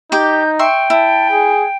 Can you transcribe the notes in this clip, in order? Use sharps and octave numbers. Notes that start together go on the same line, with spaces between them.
D#4 G4 D6 G6
E5 G5 C6 C#6
E4 A5
G#4